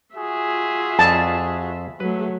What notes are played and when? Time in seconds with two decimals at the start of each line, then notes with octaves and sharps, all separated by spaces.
0.16 F4 F#4 G#4 E5
0.99 F2 A4 A5
2.00 F#3 A3 B4